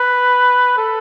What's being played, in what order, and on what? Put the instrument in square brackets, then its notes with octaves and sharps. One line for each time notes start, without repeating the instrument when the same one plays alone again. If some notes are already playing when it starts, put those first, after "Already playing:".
Already playing: [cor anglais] B4
A4